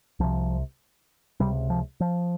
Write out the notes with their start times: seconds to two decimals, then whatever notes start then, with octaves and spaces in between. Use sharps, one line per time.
0.20 C2 C3 F3
1.40 C#2 C3 G3
1.70 F3
2.00 F3